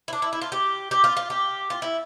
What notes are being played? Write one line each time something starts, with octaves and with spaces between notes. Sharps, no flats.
E4
D4
E4
E4
F4
G4
G4
F4
F4
G4
F4
E4